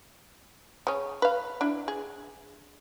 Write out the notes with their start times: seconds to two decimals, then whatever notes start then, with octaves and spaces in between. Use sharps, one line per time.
0.87 C#3 C#4
1.22 B4 F5
1.61 D4 E4
1.88 G#4